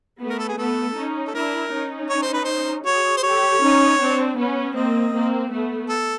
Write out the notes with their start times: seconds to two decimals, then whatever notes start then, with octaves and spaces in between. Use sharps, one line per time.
0.20 A3 B3
0.30 A#4
0.39 A4
0.49 G#4
0.58 A3 B3 A4
0.95 C#4 D#4
1.28 A4
1.34 D4 E4 A#4
1.71 C#4 D#4
2.10 C#5
2.22 C5
2.34 B4
2.45 C5
2.85 F#4 G#4 C#5
3.17 C5
3.23 G4 A4 C#5
3.62 C#4 D#4
3.99 C4 D4
4.37 B3 C#4
4.75 A#3 C4 D#5
5.13 A#3 C4
5.51 A3 B3
5.89 A4